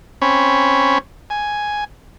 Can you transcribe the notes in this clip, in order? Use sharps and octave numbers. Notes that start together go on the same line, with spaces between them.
C4 C#4 C#5 B5
G#5